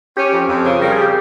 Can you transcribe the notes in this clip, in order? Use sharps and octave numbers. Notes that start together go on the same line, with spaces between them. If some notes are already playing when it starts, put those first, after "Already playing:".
C#4 G4
F2
F2
C#3
G3 A#4
G#4
G4